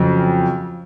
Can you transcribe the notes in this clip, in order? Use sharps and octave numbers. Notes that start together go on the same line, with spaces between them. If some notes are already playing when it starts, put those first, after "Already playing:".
Already playing: F2 C#3 F#3